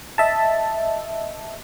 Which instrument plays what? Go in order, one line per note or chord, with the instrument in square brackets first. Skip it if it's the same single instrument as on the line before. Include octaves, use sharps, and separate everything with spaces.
[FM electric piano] D#5 E5 A5